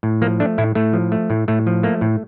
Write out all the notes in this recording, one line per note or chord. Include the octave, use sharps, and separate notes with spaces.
A2
F3 A#3
A3 D4
A2 E4
A2 A3
F3
A3
A2
A2 A3
F3
A3 A#3
A2